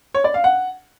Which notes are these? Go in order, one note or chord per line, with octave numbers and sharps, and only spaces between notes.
C#5
D5
F5
F#5